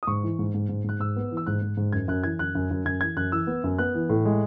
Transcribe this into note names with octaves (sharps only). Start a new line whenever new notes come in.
D#6
G#2 C#6
E3
G#2
G#2
G#2
G#2 F#6
G#2 E6
B3
E3
E6
G#2 F#6
G#2
G#2
F#2 G#6
F#2 F#6
E3 G#6
F#2 F#6
F#2
F#2
F#2 G#6
E3 G#6
F#2 F#6
E3 E6
B3
F#2
B3 F#6
E3
A2
G#3